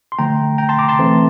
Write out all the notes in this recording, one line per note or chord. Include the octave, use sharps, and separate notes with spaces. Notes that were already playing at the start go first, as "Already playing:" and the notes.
C6
D3 F3 A3 G5 A#5
G5 A#5
A5 C6
A#5 D6
A5 C6
E3 A3 C4